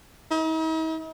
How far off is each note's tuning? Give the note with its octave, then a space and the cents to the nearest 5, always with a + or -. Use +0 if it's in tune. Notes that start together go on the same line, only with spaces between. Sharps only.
D#4 +45